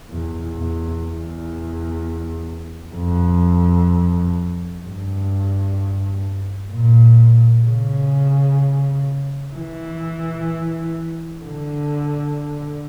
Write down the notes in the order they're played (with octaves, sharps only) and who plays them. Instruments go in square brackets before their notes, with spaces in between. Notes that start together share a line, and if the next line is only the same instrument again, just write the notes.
[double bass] E2
E2
E2
F2
G2
A#2
C#3
E3
D3